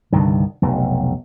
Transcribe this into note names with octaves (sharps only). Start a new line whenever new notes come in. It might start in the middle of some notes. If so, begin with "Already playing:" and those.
C2 G2 D3 D#3
F1 B1